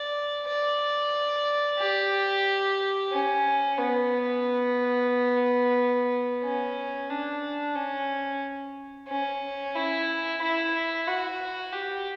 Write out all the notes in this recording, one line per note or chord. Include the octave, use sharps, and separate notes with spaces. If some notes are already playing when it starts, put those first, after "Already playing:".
Already playing: D5
D5
G4
C#4
B3
C#4
D4
C#4
C#4
E4
E4
F#4
G4